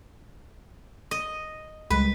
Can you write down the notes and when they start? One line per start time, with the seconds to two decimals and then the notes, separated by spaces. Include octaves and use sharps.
1.11 D#5
1.90 C#2 G3 G#3 B4